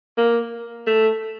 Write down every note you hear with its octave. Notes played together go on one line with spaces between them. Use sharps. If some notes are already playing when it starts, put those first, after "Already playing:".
A#3
A3